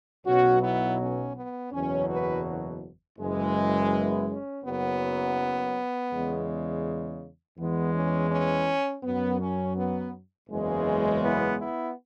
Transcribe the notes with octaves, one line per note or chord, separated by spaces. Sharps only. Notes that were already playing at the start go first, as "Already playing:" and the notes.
B1 B2 F#3 C#4 F#4
B3 E4
C#4
B3
F#1 E2 B2 F#3 C#4
F#4 B4
F#1 F#2 E3 G#3
B3 E4
C#4
F#1 F#2 F#3 B3
E2 C#3 G#3
E2 E3 G#3 B3
C#4
C#4
F#2 F#3 B3
C#4
B3
F#1 E2 C#3 E3 G#3
B3 E4
B3 E4